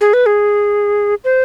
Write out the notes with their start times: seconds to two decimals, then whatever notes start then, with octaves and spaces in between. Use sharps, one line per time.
0.01 G#4
0.13 B4
0.26 G#4
1.24 C5